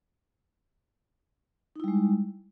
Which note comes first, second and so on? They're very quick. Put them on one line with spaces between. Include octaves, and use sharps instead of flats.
D#4 E4 G3 G#3